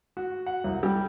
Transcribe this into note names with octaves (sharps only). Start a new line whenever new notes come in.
F#4
F#5
C2
G3